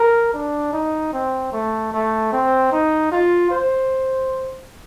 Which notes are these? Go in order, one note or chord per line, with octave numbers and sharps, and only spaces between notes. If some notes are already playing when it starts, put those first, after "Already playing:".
Already playing: A#4
D4
D#4
C4
A3
A3
C4
D#4
F4
C5